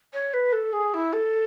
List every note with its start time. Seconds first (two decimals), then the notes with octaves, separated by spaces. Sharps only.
0.13 C#5
0.33 B4
0.52 A4
0.73 G#4
0.94 E4
1.13 A4